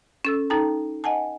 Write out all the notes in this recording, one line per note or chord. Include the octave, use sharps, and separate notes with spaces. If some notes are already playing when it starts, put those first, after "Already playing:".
C#4 A4 E6
D#4 A4 G5 A5 A#5
D#5 F#5 G#5 A5